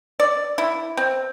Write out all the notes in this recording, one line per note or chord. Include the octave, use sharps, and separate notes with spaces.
D5
E4
C4